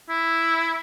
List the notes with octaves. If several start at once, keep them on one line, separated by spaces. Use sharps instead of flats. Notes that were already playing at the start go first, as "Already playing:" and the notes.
E4